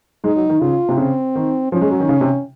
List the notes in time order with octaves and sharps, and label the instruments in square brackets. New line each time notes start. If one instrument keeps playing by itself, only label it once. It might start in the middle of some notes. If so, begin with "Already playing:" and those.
[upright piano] G#3 [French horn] D#4
[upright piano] F#3
D#3
[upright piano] C#3 [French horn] F4
[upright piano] C3
[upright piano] C#3 [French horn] C4
[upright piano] D#3
[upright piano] F3 [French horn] C#4
[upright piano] G#3
F#3
D#3
C#3
C3